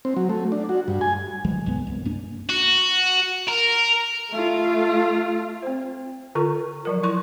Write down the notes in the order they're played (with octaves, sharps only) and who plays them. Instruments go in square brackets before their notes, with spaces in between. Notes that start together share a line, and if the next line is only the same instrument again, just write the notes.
[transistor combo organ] C4
F#3
A3
D4
F#4
G2
G#5
[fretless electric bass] D2 E3 F#3 G#3
B1 G2 G#3 B3
C2
G2 A#3 D4
[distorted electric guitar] F#4
A#4
[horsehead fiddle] A3 F4
[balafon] C4 C5
D3 F4 A4 C#6
F3 F#3 A#4
E4 C6 C#6